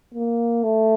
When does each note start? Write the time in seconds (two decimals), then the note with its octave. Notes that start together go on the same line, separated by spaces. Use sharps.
0.14 A#3
0.63 A3